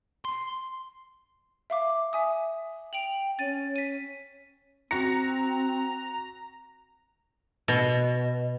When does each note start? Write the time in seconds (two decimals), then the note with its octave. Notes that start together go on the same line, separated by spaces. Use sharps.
0.25 C6
1.70 E5 F5 D6
2.13 E5 G#5 D#6
2.93 G5 D7 F7 F#7
3.39 C#4 A6 D#7
3.76 B6 D#7
4.91 C4 F#4 A#5 A#6 C#7
7.68 B2